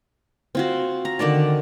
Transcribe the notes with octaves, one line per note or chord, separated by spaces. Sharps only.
C4 F4 F#4
A#5
D3 D#3 D5 A5